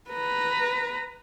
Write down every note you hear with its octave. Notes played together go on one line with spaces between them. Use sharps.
B4 A#5